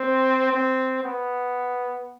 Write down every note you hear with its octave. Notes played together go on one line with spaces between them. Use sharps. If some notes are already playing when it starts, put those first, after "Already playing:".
Already playing: C4
C4
B3